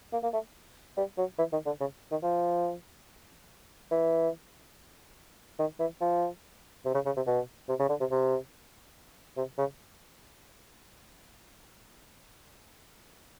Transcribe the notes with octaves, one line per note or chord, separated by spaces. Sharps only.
A#3
A#3
A3
G3
F#3
E3
D#3
D3
C#3
D#3
F3
E3
D#3
E3
F3
C3
C#3
C#3
C3
B2
C3
C#3
D3
C3
C3
C3
C#3